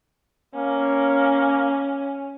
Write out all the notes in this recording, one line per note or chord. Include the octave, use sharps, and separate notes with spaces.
A#3 C#4